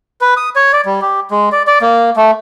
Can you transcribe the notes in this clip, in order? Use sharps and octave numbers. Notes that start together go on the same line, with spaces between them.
B4
D#6
C#5
D5
G3
G4
G#3
D5
D5
A#3
A3